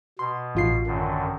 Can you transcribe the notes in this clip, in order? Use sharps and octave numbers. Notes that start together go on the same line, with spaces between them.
B2 C6
A1 F4 C7
F#2 D3 D#3